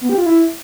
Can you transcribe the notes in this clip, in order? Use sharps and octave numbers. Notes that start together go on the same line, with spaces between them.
B3
G4
F4
E4